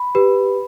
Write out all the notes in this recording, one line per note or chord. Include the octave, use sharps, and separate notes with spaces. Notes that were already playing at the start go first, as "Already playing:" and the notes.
Already playing: B5
G4 B4